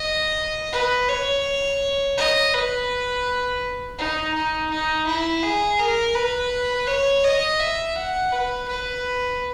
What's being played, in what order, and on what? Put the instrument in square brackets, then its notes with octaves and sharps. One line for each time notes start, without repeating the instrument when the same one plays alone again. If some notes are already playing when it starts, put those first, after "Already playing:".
Already playing: [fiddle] D#5
B4
C#5
D#5
B4
D#4
D#4
D#4
E4
G#4
A#4
B4
C#5
D#5
E5
F#5
B4
B4